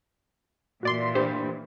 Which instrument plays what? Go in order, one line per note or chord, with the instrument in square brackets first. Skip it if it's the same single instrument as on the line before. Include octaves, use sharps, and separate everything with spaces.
[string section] A#2 E3 [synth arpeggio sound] F#4 D5 C6
[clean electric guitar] D4 B4 [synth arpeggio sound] G4 C5